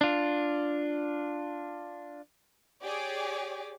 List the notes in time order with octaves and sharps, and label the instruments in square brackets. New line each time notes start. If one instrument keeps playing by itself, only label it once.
[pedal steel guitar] D4 F4
[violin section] G4 G#4 C#5 D5 D6